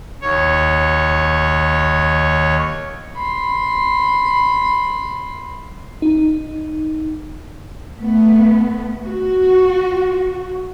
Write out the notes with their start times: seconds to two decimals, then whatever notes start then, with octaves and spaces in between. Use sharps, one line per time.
0.21 D#2 C#5
3.16 B5 C6
6.02 D#4
7.99 A3 B3
9.04 F#4